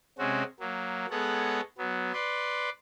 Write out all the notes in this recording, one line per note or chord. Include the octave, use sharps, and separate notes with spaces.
C3 G#3 C4 C#4 F#4
F#3 A#3
G#3 B3 A4 C#5 F#5
F#3 B3
B4 D5 C6